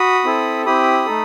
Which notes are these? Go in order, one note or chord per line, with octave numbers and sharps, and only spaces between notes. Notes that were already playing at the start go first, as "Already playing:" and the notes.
Already playing: F#4 B5 D#6
C4 E4 A4
C4 E4 G4 B5 D#6
A3 D#4 A4